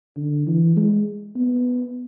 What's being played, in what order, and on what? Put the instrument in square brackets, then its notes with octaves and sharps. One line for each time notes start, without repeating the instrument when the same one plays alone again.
[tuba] D3
E3
G#3
B3